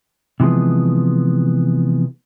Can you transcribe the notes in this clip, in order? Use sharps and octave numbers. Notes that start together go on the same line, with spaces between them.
C3 E3 F3 G#3 B3